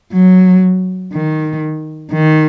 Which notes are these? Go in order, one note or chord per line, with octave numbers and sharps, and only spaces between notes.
F#3
D#3
D#3